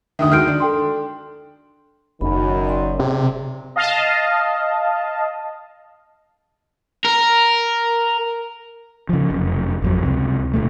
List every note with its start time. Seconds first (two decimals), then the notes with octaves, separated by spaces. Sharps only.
0.19 D2 D3 D#3 E5 D#6
0.32 D#3 G#3 F#4 F6 G6 D7
0.48 D4
0.60 A4 G5 C6
2.21 F#1 F#2 D#3 B5
2.65 D5 C6
3.00 C3 G#4
3.76 D#5 F5 A5
7.05 A#4
9.09 C#3 F3
9.30 F1 F#2
9.82 G#1 F2 F#3
10.03 C#2 C3
10.53 D#1 D2 B2 A3